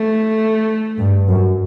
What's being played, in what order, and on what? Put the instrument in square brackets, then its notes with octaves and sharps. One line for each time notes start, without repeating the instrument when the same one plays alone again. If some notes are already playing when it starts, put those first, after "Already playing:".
Already playing: [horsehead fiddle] A3
[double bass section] G2
F#2